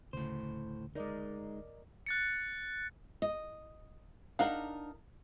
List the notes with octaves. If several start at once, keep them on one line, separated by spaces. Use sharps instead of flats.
D2 A2 C#3 C5
G#3 D#4 A#4 D5 D#5
F#6 A6 C#7
D#5
D4 D#4 A#4 F5 F#5